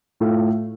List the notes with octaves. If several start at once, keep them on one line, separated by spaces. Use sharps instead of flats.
A2 A3 F4